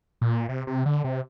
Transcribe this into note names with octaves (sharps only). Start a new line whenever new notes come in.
A#2
C3
C3
D3
C3